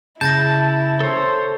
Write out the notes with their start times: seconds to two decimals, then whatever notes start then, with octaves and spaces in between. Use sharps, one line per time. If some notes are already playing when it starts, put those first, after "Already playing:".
0.21 C#3 E4 A5 G6 A6 A#6
1.00 A4 C5 C#5